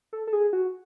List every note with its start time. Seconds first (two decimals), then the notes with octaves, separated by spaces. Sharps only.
0.13 A4
0.27 A4
0.33 G#4
0.53 F#4